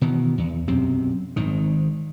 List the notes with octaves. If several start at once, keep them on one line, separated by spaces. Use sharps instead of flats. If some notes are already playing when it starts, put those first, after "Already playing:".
B2 D#3 E3
E2
B1 F#2 C3 C4
G#1 G#2 D#3